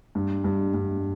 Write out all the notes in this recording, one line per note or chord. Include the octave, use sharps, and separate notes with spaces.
G2
G2
G2